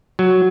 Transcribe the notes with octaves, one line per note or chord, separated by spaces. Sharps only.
F#3